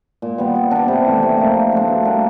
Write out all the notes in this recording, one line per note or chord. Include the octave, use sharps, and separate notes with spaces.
A#2
G3 B3
G3
B3 D4
C3
E3 A3
C3
F3 A#3
F3
A3 D4
B2
G3 A#3 D4